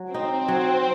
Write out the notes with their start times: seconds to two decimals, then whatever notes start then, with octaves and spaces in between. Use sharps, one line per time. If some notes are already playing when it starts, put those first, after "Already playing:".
Already playing: F#3
0.14 C4 D#4
0.48 F#3